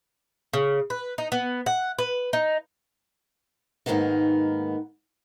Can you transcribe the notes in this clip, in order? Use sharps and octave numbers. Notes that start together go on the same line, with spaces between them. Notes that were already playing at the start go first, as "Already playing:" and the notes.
C#3
B4
D#4
B3
F#5
B4
D#4
G#2 D#3 E3 A#3 B3 D#4